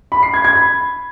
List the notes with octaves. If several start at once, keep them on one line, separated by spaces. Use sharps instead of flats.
B5
C7
G#6
G#6
B5